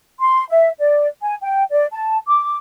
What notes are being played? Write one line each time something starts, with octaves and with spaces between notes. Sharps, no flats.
C6
E5
D5
G#5
G5
D5
A5
D6